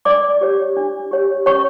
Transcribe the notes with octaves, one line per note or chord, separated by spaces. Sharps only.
D4 D5 D6
G4 C#5
D4
G4 C#5
C#4 C#5 C#6